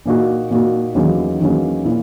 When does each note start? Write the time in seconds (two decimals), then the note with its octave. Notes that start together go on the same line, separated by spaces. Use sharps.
0.06 A#2 A#3 D#4 F#4
0.50 A#2 A#3 D#4 F#4
0.95 E2 D#3 F#3 A#3 C#4
1.40 E2 D#3 F#3 A#3 C#4
1.85 A#2 A#3 E4